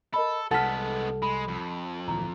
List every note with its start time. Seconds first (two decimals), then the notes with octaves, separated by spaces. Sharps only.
0.14 A4 A#4 D#5 B5
0.51 C2 G#3 B3 A4 F#5 A5 F6 B6
1.22 G#3 B5
1.48 F2
2.08 D2 A#2 E3 A#5